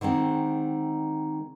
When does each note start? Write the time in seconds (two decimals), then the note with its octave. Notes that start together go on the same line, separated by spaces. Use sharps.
0.01 D3 D#3 G#3 C4